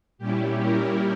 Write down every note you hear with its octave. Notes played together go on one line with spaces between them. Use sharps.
A#2 G3 C#4 E4 G4
A#4